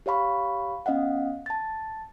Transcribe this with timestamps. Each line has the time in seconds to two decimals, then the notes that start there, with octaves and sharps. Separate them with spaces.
0.06 G4 C#5 F5 B5 C#6
0.86 B3 C#4 D#5 F5 F#5
1.46 A5 A6